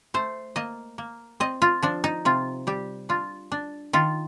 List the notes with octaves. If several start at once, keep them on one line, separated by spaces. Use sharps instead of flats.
A3 C5
A#3 D#5
A#3
C4 D#5
F4
F3 D4
D#4
C3 F4
G3 G4
D4 F4
D4
D#3 F4